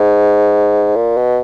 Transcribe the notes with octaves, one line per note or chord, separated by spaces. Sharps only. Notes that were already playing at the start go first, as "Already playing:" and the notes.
Already playing: G#2
A#2
B2